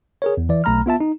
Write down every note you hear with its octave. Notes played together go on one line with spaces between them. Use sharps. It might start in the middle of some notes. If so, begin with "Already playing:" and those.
G#4 A#4 C#5
E2
E3 D5 E5
B1 A3 A#5 B5 F6
B3 F4 E5 A5
D#4